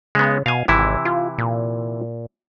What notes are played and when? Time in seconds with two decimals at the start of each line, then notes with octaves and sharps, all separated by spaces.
0.15 C#3 G#3 B3
0.46 B2 F5 G#5
0.68 G#1 C3 E3 E4
1.05 F4
1.38 A#2